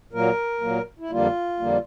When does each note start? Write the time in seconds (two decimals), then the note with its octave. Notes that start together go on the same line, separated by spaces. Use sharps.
0.12 A#2 F#3 A#3 A#4
0.61 A#2 F#3 A#3
0.99 E4
1.10 F2 D3 G3 A#3 F4
1.60 F2 D3 G3 A#3